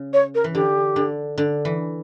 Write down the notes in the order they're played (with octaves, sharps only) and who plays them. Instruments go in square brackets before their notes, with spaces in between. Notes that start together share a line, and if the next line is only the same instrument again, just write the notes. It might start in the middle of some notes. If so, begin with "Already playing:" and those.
Already playing: [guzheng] C#3
[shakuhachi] C#5
A#4
[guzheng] E3
[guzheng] D3 [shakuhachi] G4
[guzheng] D3
D3
E3